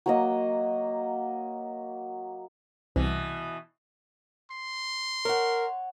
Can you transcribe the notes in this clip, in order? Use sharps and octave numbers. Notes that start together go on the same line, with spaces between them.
F#3 A#3 D#5
C2 B2 E3
C6
A#4 C#5 F#5